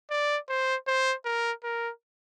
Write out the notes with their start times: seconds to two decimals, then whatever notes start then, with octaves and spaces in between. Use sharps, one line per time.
0.10 D5
0.49 C5
0.87 C5
1.25 A#4
1.63 A#4